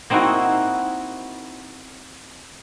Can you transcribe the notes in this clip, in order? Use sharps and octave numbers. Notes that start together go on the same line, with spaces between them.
A#3 C4 D#4 E4 F#4